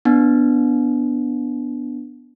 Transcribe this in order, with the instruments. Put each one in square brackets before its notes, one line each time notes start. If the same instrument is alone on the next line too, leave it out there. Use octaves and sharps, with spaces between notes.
[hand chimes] B3 D4